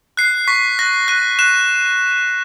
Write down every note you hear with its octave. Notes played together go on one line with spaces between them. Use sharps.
F#6 C7
C#6 B6
F#6 A#6
F#6 D#7
F#6 E7